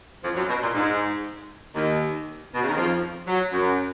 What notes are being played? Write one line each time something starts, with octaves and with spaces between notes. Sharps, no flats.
F2 F3
F#2 F#3
B2
A#2
G#2
D#2 D#3
B2
C#3
D#3
F2 F3
F#3
F#2 F#3